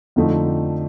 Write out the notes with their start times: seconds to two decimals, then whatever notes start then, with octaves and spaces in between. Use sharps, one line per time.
0.16 F2 D3 F3 A3 D#4